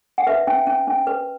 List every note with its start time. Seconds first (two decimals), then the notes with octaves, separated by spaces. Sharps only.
0.18 F#5
0.27 B4 E5
0.47 C#4
0.67 C#4
0.88 C#4
1.07 B4